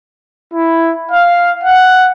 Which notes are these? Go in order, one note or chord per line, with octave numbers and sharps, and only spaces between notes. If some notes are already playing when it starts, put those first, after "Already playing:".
E4
F5
F#5